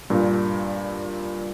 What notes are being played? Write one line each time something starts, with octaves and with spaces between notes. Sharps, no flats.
G2 A#2